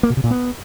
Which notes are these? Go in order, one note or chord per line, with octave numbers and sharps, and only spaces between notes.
A#3
B2
C3
A#2
B3